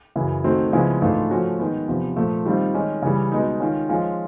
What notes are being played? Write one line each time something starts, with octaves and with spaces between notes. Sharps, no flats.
F#2 C#3 E3
D#3 F#3 A3 C4
C#3 F3 G#3 B3 E4
G#2 E3 A3 D4 F4
F3 A3 C#4 F#4
D#3 G#3 B3
E2 C3 F3
A#2 F3 A3
D#3 G3 C4 F4
D#3 G#3 C#4
C#3 E3 G3
B2 G#3 B3 D#4
D#3 G#3 C#4 F4
F3 G#3 C#4 F4